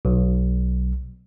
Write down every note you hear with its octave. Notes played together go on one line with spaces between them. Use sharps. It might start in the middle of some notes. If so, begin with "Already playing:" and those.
B1